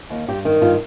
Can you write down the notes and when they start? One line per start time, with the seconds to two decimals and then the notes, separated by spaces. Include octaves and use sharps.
0.10 D#2
0.28 G2 G4
0.45 D#3
0.61 G2 F4